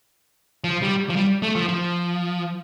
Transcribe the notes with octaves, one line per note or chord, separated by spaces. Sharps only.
F3
G3
F3
G3
A3
F3
F3